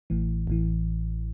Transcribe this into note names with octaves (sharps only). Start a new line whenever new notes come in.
A1 A2 E3
A1 A2 E3